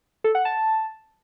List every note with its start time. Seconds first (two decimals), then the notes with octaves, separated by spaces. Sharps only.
0.24 A4
0.35 F#5
0.45 A5